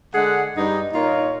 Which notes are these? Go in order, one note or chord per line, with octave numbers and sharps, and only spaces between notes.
D3 G#3 G#4 F#5
G2 D#4
A#2 D#4 F4 A#4 C#5